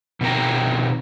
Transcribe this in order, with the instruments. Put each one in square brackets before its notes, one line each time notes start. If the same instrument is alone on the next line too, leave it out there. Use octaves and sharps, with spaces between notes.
[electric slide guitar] B2 D#3 C4 G5 A#5